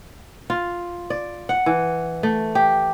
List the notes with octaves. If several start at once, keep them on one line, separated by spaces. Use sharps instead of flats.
F4
D5
F#5
E3
A3
G4